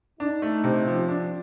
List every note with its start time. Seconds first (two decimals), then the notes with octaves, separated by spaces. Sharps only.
0.20 D4 D#4
0.42 A3
0.64 C3
0.87 F3 C#4
1.08 D4